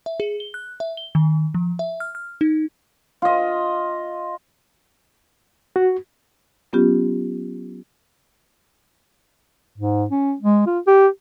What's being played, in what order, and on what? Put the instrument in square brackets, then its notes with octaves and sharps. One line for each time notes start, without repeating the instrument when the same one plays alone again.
[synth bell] E5
G#4
G7
F#6
E5
G7
D#3
F3
E5
F6
F6
D#4
[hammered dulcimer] F4 D#5
[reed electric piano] F#4
[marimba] F#3 B3 C#4 F4 G4
[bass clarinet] G#2
C#4
G#3
F4
G4